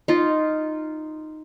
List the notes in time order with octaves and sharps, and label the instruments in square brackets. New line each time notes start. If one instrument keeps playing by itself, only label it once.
[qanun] D#4 F4